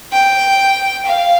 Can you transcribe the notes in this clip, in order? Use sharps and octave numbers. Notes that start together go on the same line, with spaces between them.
G5
F5